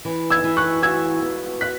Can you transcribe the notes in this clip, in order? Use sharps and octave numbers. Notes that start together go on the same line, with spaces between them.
E3
E6 G#6
E3
C#6 F#6
F#4 E6 G#6
B3
F#4 F#6 B6